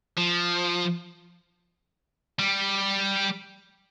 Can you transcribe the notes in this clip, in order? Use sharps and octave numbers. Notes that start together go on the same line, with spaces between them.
F3
G3